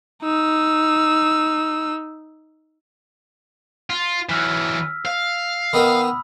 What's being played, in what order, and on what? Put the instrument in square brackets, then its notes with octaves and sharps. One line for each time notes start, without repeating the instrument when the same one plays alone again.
[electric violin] D#4 E6
[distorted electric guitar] F4
[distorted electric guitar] E3 F#3 [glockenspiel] E6 F6 B6
[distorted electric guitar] F5
[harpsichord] D#3 B3 A#4 [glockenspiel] B5 D#6 E6